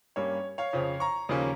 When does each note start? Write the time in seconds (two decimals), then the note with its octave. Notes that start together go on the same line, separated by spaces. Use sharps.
0.16 G2 G3 A#3 C#4 C#5
0.58 C#5 F5
0.73 F2 C#3 F3 C4
1.00 A#5 C#6
1.29 D#2 C#3 F3 A#3 C#4